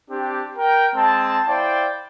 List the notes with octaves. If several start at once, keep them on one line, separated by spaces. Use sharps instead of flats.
C4 D4 G4
A#4 G5
G#3 C4 A5
E4 C5 D5 F5 G5